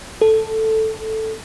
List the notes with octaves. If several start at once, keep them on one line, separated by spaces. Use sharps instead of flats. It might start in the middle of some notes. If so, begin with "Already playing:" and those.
A4